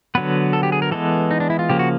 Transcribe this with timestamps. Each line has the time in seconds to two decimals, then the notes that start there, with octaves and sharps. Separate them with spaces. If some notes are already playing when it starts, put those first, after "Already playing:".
0.15 D3 F#3 B3 B4
0.53 A4
0.63 G4
0.72 G#4
0.82 A#4
0.91 E3 G#3 B3 A4
1.31 D#4
1.40 D4
1.50 E4
1.59 F4
1.69 C#3 F3 A#3 G4
1.79 F#4